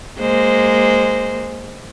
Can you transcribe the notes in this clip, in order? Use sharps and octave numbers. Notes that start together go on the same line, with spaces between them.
G#3 A#3 C5